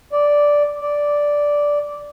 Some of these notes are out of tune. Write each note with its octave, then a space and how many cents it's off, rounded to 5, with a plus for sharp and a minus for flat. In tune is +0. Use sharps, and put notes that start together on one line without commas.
D5 -5
D5 -5